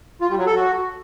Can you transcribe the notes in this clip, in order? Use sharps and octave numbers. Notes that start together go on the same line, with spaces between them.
F4
G3
F#3
A4
F#4